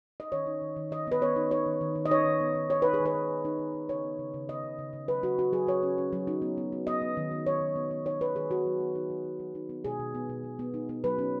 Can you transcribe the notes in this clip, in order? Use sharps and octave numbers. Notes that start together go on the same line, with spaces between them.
D#5
D#3 C#5
D#4
D#3
D#3
D#3 D#5
B3 B4
B3 C#5
D#4
D#4 C#5
D#3
D#3
D#3
D#5
D#4 C#5
D#3
B3
D#3
D#3 C#5
D#4 B4
G#4
D#3
B4
D#3
D#3
D#4
D#3
D#3
C#3 C#5
B3
C#3
C#3
B3 D#5
C#3
C#3
C#3
F#3 B4
F#3 F#4
F#3 F#4
F#3 G#4
F#3 C#5
C#4
C#4
F#3
D#4
B3
B3
B3
B3 D#5
B3
D#3
B3
D#3 C#5
D#3
B3
B3
D#4 C#5
D#3 B4
D#3 G#4
B3 F#4
F#3
B3
D#4
F#3
F#3
F#3
D#4
B3
B2 G#4
B2
B3
B2
B2
B3
D#4
B3
F#3 B4
C#4